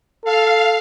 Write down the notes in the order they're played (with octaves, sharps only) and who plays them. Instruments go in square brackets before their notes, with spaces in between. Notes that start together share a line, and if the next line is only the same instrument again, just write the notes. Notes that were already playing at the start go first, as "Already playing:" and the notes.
[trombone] A4 [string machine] F5